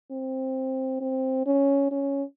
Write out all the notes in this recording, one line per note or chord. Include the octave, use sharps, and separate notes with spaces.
C4
C4
C#4
C#4